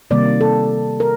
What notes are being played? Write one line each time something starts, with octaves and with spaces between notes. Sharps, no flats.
C3 D#3 G3 A#3 D5
A4
A#4